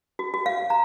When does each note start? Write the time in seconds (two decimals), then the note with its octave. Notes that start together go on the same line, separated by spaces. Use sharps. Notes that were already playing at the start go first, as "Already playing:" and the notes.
0.19 F#4
0.34 F#4
0.46 F5
0.70 A#5